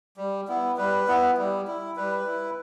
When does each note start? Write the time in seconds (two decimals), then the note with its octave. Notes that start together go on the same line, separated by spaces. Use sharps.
0.17 G3
0.48 B3 E4
0.77 G3 B4
1.08 B3 E4
1.37 G3
1.67 E4
1.96 G3 B4
2.27 E4